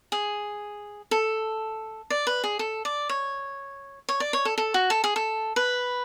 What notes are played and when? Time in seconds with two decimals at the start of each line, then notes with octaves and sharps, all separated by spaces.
0.12 G#4
1.11 A4
2.10 D5
2.27 B4
2.44 G#4
2.59 A4
2.85 D5
3.09 C#5
4.09 C#5
4.20 D5
4.33 C#5
4.45 A4
4.58 A4
4.74 F#4
4.90 A4
5.04 G#4
5.16 A4
5.56 B4